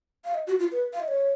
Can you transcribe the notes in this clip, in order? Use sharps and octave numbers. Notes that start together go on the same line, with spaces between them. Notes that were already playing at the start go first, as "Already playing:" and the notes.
F5
D#5
F#4
F4
B4
F5
D#5
C#5